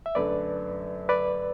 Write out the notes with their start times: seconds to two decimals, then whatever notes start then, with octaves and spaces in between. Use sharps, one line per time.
0.06 E5
0.15 F#2 D3 A3 B4 D5
1.09 B4 D5